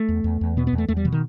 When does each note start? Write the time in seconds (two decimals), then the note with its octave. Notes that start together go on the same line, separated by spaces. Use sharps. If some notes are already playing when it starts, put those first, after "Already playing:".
Already playing: A3
0.09 E2
0.24 E2
0.41 E2
0.57 B2 B3
0.67 B3
0.73 E2
0.78 A3
0.88 E2 A3
0.97 G3
1.05 B2 E3
1.12 D#3